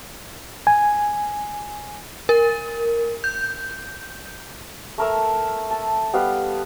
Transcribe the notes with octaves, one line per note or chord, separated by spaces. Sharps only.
G#5
A#4
G6
A3 A#4 E5
A5
G3 B3 B4 F5